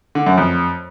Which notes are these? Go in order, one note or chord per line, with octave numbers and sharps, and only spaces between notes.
D3
F#2
F2